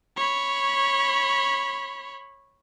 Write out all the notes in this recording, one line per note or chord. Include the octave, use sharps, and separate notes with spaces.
C#5 B5